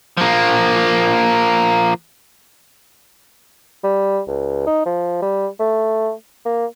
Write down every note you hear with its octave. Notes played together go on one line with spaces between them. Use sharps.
F3 A#3
G3
C#2
D#4
F3
G3
A3
A#3